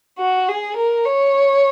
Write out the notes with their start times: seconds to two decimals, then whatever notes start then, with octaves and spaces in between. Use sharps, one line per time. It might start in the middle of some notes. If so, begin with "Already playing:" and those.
0.19 F#4
0.48 G#4
0.76 A#4
1.05 C#5